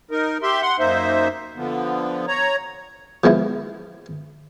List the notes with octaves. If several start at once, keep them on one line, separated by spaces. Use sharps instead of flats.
D#4 A#4
G4 E5 C6
F#5 C6
F#2 A#3 D#4 C5 E5
D3 F3 B3
C#5 A#5
F3 G#3 B3 E4